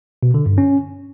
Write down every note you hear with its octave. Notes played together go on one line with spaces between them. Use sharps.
B2
D3
G2
C#4